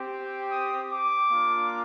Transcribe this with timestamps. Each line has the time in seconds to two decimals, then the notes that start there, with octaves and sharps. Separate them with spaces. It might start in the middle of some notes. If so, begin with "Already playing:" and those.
Already playing: C4 G4
0.49 D#6
0.90 D6
1.30 A#3 D4 F4